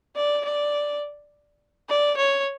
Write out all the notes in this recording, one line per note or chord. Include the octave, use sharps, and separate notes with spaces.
D5
D5
D5
C#5